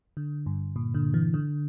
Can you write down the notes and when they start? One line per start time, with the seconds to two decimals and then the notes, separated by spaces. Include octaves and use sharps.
0.17 D3
0.46 G2
0.76 A#2
0.94 D3
1.14 E3
1.34 D3